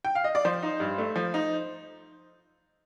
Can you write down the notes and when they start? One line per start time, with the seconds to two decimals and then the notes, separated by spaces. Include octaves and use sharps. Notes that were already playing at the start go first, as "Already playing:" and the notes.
0.05 G5
0.15 F5
0.24 D#5
0.35 D5
0.45 F3 C5
0.63 D#4
0.80 G2
0.98 A3
1.16 F3
1.34 D#4